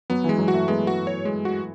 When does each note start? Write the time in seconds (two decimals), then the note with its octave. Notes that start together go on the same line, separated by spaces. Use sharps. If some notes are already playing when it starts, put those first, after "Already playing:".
0.10 F#3 B3
0.24 E3 G#3
0.38 F#3
0.48 F#4
0.54 A3
0.68 G#3 B3
0.87 F#4
1.07 C#5
1.25 G#3
1.45 F#4